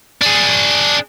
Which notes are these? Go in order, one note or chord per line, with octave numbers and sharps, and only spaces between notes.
D4 G#4